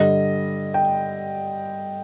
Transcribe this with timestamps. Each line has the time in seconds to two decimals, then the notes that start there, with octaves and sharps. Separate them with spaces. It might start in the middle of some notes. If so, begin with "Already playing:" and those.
Already playing: G2 D3 G3 D#5
0.74 G5